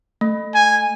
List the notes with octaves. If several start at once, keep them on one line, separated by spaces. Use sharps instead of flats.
A3
G#5